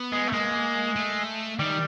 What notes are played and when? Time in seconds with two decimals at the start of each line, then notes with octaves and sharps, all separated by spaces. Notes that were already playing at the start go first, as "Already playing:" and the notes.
Already playing: B3
0.12 G#3
0.28 A3
0.33 G#3 A#3
0.96 A3
1.59 D#3 G3